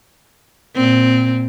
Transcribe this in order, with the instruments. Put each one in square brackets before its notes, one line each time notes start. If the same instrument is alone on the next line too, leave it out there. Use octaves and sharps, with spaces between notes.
[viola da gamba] A#2 C4